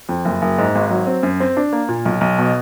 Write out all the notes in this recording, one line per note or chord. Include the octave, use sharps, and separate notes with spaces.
F2
F#1
F#1
G#2
G#1
F#3
C4
F#2
C4
D4
A#3
A#2
B1
B1
B2